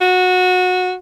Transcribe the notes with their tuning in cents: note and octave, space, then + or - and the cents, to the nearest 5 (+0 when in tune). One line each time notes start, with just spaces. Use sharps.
F#4 -20